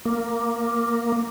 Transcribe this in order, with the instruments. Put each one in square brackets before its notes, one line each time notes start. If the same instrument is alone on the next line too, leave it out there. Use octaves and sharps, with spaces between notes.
[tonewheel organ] A#3